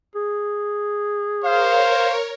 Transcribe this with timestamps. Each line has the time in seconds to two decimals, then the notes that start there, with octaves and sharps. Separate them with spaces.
0.15 G#4
1.44 A#4 C5 C#5 F5